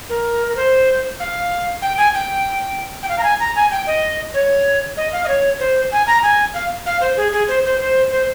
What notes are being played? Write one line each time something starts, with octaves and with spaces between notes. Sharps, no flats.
A#4
A#4
C5
F5
G5
G#5
G5
G5
F5
A#5
G#5
A#5
G#5
G5
D#5
C#5
D#5
F5
D#5
C#5
C5
G#5
A#5
G#5
F5
F5
C5
G#4
G#4
C5
C5
C5
C5